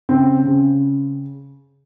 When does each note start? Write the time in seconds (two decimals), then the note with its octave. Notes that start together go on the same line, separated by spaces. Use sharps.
0.09 C#3 C4
0.46 C#3